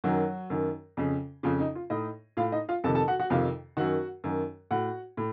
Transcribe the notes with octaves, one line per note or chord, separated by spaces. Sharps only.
F#2 D#3 F#3 F#4
F#2 D#3
F2 C#3
F2 C#3 F4
D#4
F4
A2 D#4 D#5
A2 F4 F5
D#4 D#5
F4 F5
F2 C3 D#3 A4 A5
A4 A5
F#4 F#5
F#4 F#5
F2 C3 D#3 F4 F5
F#2 D#3 F#4 F#5
F#2 D#3
A2 F#4 F#5
A2